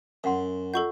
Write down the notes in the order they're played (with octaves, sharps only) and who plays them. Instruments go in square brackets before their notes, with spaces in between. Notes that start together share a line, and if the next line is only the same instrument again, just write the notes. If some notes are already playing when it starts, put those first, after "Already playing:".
[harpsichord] F#2 [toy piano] F5 F#5 C6
[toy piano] F4 D#5 F#5 [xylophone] A4 C#6 G6